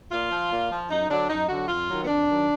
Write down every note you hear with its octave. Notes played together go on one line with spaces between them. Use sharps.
A#2 F4
F3
A#2
F3
F#2 D#4
D3 F#3 D4
F#2 D#4
D3 F#3 F#4
F2 F4
D#3 F#3
B3
F2 D4
D#3 F#3